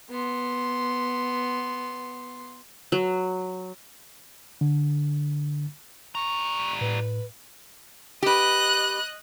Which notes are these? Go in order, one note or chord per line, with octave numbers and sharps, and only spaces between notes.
B3 C6
F#3
D3
G3 A#5 C#6
A2 B4
G4 B4 D#5 F#6